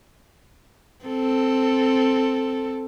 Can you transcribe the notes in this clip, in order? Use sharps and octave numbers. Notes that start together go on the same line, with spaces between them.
C4 A4